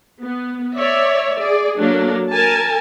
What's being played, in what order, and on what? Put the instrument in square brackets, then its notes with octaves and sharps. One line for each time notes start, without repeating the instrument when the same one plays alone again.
[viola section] B3
C#5 D5 E5
G#4 D5
F#3 A#3 D4 A4
A#4 G#5 A5